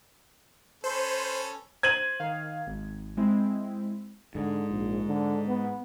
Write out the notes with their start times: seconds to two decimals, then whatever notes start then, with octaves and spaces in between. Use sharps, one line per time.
0.84 C#4 A4 B4 C5
1.83 C5 G#6 D#7 F#7
2.20 D#3 F5
2.67 G#1
3.17 G#3 C4 E4
4.35 G#2 D3
4.70 A#1
5.07 D3
5.48 B3